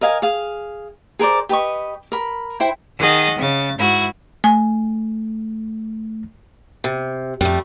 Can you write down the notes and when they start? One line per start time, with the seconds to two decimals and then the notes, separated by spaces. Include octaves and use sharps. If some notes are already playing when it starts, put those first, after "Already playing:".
0.01 A#4 D#5 F5 G#5
0.22 G#4 F5
1.19 G#4 A#4 C5 D5
1.49 G4 B4 D#5 C#6
2.12 A#4 B5
2.60 E4 C5 G5 B5
2.98 D#3 G#4 D#5 F#5 A6
3.38 C#3 A6
3.78 G#2 E4 F#4
4.44 A3 G#5
6.84 C3
7.41 F2 G3 A3